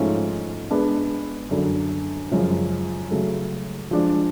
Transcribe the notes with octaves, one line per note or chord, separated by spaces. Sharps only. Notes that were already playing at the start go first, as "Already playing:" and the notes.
Already playing: G#2 F3 A3 C#4 F4
G#3 B3 D4 G#4 B4
F#2 D3 F#3
F#2 C#3 F3 G#3 C#4
C#3 F#3 A3
F3 G#3 D4